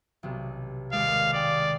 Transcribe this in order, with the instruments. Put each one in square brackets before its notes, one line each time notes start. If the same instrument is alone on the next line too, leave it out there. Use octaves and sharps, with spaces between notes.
[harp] B1 C3
[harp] D#2 G#3 D5 [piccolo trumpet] F5
[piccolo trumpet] D5 [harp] G5 D#6